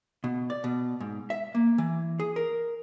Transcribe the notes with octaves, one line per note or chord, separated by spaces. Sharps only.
B2
D5
B2
G#2
E5
A#3
E3
G#4
A#4